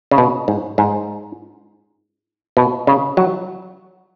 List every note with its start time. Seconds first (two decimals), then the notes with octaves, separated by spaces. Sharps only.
0.11 C#3
0.18 B2
0.48 G#2
0.78 G#2
2.57 B2
2.87 C#3
3.17 F#3